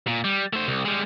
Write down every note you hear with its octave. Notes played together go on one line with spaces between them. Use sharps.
A#2
G3
A3 C5
C2
G3 G#3